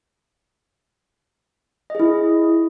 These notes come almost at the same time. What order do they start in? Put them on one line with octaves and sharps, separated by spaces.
D#5 G#4 E4